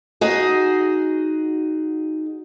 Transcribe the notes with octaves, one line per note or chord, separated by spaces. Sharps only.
D#4 F#4 G#4